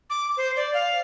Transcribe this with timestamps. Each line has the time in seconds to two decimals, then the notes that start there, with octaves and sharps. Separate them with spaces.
0.10 D6
0.37 C5
0.57 D5
0.74 F5